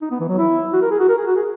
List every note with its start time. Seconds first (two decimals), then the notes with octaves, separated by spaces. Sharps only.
0.02 D#4
0.11 B3
0.20 E3
0.29 F#3
0.38 E4
0.73 F#4
0.82 A#4
0.91 G#4
1.00 F#4
1.09 A#4
1.18 G#4
1.27 F#4
1.36 G#4